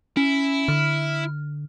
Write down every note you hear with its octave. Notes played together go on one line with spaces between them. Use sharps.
C#4 E4
D3 F6